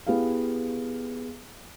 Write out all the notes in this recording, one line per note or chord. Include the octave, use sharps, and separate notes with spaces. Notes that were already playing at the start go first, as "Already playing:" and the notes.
B3 E4 G4 G#4 F5